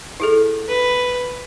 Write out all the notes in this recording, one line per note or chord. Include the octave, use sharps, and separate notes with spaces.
E4 G#4 A4
B4